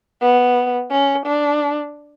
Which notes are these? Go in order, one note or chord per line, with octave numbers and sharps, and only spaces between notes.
B3
C#4
D4